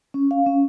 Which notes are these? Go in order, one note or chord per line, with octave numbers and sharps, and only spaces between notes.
C#4
F5
C#4